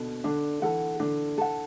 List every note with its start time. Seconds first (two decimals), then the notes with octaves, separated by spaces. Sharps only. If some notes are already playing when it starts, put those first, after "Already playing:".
Already playing: B2 D3
0.24 D3 D4
0.62 E3 A4 F#5
1.00 D3 D4
1.38 A4 F#5